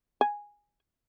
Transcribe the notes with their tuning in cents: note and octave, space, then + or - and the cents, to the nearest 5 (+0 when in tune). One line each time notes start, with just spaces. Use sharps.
G#5 -10